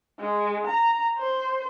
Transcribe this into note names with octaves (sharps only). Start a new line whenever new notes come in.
G#3
A#5
C5